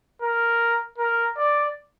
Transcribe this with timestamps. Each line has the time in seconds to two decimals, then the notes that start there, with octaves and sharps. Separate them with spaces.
0.22 A#4
0.98 A#4
1.37 D5